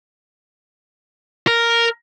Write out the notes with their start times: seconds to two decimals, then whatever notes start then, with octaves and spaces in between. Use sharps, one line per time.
1.47 A#4